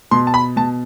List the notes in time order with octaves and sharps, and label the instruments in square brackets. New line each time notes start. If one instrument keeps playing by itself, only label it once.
[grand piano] B2 C6
A5
B5
B2 A5